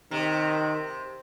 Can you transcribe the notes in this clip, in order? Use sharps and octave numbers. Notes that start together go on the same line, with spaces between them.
C3 D#3